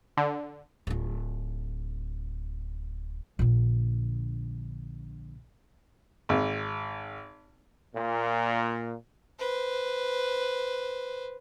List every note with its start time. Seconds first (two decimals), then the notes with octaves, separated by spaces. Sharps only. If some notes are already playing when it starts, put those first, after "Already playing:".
0.17 D3
0.87 D1 F4
3.39 A#1 D3
6.29 G#1
7.95 A#2
9.39 B4 C5